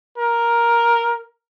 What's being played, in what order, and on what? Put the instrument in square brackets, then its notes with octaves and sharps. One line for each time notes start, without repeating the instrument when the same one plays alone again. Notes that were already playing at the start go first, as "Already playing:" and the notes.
[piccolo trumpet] A#4